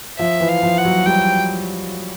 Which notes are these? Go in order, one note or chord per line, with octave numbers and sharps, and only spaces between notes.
F3 E5
E3
F5
F3
F#5
F#3
G3 G5